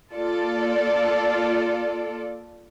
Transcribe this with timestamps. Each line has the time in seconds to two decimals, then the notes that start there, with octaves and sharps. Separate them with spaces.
0.14 A#3 F4 A4 D5